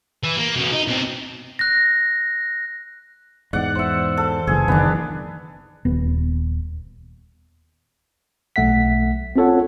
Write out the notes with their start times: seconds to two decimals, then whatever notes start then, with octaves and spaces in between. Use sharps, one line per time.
0.24 E3
0.37 A#3
0.55 B2 C#4
0.72 D#4
0.88 B2 C4
1.59 F#6 A#6
3.53 E2 G#2 D5 F#5
3.75 C5 E5
4.17 A4
4.47 F#1 E3 G#4
4.68 F#1 D#3 E3 B3 D4
5.85 D#1 B3
8.56 B1 A3 E5 F#5 B6
9.36 C4 C#4 F4 A4 C#5 F#5